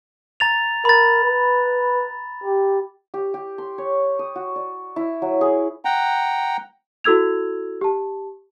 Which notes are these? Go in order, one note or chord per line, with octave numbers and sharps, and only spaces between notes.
A#5 A6 F7
A#4 B5 A6
B4
G4
G4
G4
C6
C#5
D#6
F#4
D5
E4
F#3
G#4
F#5 G5 A#5
E4 F#4 A4 E6 G#6 F7
G4 A5